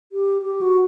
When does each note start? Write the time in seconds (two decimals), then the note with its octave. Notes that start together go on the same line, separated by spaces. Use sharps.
0.12 G4
0.42 G4
0.61 F#4